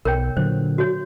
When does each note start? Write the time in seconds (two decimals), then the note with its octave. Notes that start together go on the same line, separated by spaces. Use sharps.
0.05 B1 A#4 C#5 G5
0.37 A#2 D3 F#3 C5
0.78 F#4 C#5